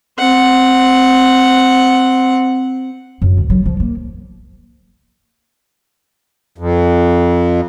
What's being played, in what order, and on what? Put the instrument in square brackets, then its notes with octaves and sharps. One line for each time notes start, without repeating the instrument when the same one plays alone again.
[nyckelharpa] C4 F#5
[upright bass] F#2
D2
F#3
F3
A#3
[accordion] F2